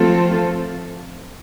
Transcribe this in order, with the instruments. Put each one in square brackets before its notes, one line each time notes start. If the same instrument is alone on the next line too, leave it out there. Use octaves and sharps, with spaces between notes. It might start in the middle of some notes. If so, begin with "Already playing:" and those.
Already playing: [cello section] F3 A3 C4 F4 A4